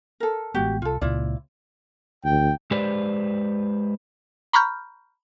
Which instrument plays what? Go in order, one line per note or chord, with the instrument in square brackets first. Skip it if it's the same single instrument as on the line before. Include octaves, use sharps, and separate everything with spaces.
[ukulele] A4 A#4
[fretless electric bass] A1 G#3 B3 [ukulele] F#4 G4
[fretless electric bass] C2 [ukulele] F4 A4
[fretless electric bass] C#2 A#2 [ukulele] E4 F4 D5
[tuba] D2 [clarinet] G5
[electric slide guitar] G#3 G4 B4 C5 D5
[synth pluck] A#5 B5 C#6 F6 G6